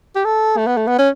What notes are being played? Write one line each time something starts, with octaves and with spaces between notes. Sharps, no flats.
G4
A4
A3
B3
A3
B3
C#4